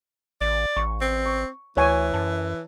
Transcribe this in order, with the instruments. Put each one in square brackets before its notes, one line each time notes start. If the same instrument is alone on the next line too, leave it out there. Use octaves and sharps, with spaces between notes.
[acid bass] A1 [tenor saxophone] D5
[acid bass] A1 [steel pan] C#6
[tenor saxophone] C4
[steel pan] C#6
[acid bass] D2 [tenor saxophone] E3 [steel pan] C#5 G#5
[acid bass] F#2 [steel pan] A5